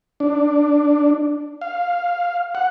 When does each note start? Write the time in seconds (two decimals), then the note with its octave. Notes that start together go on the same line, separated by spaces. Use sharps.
0.20 D4
1.61 F5
2.55 F#5